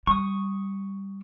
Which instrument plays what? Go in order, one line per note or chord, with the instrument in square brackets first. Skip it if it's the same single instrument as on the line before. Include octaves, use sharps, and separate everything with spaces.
[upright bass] G3 [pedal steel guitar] C#6 D#6